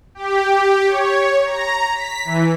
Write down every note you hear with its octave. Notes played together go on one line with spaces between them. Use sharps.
G4
C#5
A#5
B6
E3